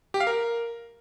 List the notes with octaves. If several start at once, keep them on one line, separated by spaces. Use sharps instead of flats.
G4
F5
A#4